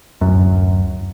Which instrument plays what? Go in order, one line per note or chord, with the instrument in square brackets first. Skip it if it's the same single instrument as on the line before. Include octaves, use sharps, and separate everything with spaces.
[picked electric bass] D1 F#2